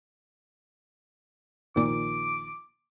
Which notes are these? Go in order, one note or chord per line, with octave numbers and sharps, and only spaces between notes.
A#1 A#2 D#3 D6